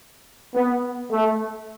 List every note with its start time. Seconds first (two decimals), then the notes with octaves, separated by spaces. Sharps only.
0.55 B3
1.12 A3